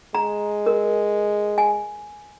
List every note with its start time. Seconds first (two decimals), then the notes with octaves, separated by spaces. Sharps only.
0.15 G#3 A#5
0.66 A#4
1.58 G#5